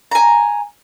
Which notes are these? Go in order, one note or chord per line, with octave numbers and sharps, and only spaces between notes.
G#5 A#5